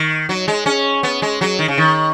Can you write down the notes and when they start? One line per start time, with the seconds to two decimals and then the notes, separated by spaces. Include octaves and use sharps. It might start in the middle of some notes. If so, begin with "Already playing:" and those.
Already playing: D#3
0.29 F#3
0.48 G#3
0.66 C#4
1.03 B3
1.22 G#3
1.41 F#3
1.59 D#3
1.68 C#3
1.78 D#3